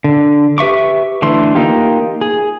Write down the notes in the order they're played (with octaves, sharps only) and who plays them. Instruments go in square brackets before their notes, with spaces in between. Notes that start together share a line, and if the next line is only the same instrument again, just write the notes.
[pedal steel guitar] D3
G4 B4 E5 C#6 D6
D3 E3 A3 C6
A#3 D#4 F4 G4
G#4